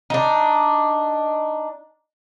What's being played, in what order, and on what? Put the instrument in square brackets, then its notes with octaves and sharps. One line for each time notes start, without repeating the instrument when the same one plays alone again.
[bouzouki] D4 D#4